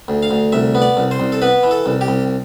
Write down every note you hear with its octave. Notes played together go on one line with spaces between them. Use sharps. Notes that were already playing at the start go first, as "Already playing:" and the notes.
D2
F5
D2
C2 E5
B3
D5
C2
C5
C2
A4
B3 B4
E3
A4
C2
G4
C2